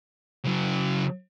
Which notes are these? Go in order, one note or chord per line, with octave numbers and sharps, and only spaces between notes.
C#3 F#3